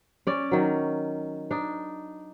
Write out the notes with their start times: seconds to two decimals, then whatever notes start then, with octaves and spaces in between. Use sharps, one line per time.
0.27 C#4 D5
0.52 D#3 F#3
1.51 D4 D#4